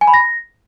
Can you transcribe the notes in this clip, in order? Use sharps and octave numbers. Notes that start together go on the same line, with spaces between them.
G#5
B5
A#6